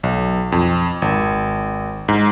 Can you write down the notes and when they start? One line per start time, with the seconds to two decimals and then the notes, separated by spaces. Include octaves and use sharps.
0.03 B1
0.52 F2
1.02 G#1
2.08 G#2